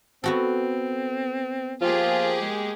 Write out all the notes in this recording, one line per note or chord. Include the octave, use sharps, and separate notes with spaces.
B3 C4 F#4 A4
F3 A#3 F4 G4 G#4
G#3